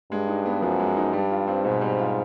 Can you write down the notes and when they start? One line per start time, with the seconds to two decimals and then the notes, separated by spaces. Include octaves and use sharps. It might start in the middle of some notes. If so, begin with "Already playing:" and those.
0.11 G2 G#3
0.28 D#4
0.46 B3
0.62 F#2 F3
0.80 G#3
0.97 D#4
1.13 G2 G3
1.30 F4
1.47 C4
1.64 G#2 B2
1.81 G3
1.99 F4